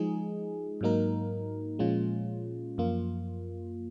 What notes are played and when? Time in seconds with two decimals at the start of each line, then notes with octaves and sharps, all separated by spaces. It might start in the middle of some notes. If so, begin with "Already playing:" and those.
Already playing: F3 G#3 D#4 G#4
0.81 G#2 F#3 A#3 D#4 A#4
1.79 A#2 F3 G#3 C#4 F4
2.78 F#2 F3 A#3 F4